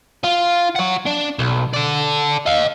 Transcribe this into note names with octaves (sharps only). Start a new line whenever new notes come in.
F4
C#5 F#5
D4
B1
A4 D5
D#5 F5